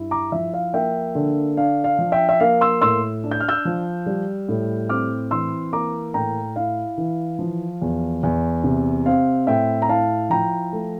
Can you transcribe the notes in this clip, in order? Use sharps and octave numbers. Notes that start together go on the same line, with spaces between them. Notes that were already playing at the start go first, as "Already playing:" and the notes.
Already playing: G2 E4
A#5 D6
F3 E5
F5
A#3 E5 G5
D3
D4 F5
F5
F3
E5 G5
E5
A#3 F5
C6 E6
A2 C6 E6
D4
G6
F6
E6 G6
F3
G3
A2
C4 D6 F6
E3 C6 E6
A#3 A#5 D6
A2 G5 A#5
E4 F5
E3
F3
E2
E2
C3
C4 F5
A2 E5 G5
A#5
E4 F5 A5
F3 G5 A#5
A3